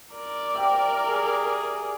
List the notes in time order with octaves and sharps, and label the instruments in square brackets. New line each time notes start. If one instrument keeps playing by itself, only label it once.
[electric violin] A#4 D5
[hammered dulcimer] G4 E5
[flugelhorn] G#4